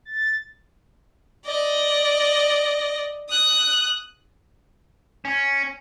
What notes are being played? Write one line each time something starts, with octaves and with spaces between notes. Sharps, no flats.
A6
D5 D#5
D#6 F#6
C#4